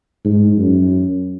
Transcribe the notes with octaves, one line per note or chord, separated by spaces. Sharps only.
G#2
F#2